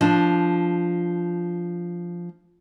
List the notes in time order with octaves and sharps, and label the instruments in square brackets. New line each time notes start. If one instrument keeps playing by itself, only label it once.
[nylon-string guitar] F3 D4